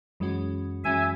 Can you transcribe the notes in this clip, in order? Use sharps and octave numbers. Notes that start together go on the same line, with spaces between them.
F#2 E3 G#3 C#4 F#4
F#2 E3 G#3 C#4 F#4 E5 G#5